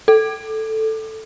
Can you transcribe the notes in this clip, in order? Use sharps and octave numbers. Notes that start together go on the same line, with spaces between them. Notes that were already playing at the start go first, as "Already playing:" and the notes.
A4